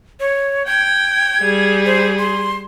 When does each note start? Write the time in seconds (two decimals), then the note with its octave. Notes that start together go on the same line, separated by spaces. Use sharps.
0.20 C#5
0.67 G5 G#6
1.41 G3 G#4
1.86 C5
2.19 C6